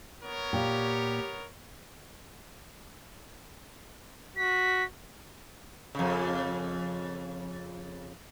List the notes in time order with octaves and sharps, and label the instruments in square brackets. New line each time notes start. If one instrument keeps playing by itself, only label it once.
[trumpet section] B3 A#4 C#5
[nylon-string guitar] A#2 G5 [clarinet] G4
[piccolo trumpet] F#4 [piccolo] B6
[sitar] F2 C#3